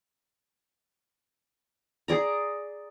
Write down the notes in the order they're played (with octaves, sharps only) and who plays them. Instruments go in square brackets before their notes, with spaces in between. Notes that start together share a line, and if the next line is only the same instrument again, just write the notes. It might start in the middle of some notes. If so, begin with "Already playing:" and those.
[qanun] G#4 D5 A#5